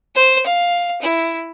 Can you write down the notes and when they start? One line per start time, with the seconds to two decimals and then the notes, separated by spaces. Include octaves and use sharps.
0.15 C5
0.46 F5
1.01 E4